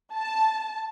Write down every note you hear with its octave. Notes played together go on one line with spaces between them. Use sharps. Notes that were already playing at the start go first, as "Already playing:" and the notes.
A5